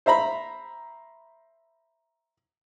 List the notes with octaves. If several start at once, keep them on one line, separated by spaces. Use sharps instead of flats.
C5 E5 A#5 B5